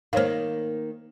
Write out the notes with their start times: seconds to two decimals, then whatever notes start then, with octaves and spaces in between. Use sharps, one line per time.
0.13 D#3 A#3 C5 C#5 F5